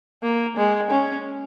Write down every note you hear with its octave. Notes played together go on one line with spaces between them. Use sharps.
A#3
G#3
C#4